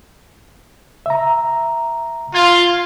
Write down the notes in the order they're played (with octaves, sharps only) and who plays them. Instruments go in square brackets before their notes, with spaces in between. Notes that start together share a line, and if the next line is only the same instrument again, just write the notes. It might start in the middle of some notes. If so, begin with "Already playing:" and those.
[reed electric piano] E5 A#5
[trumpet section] F4 [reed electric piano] G#6